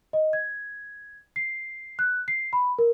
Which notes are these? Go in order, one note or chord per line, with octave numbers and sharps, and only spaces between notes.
D#5
G#6
C7
F#6
C7
B5
A#4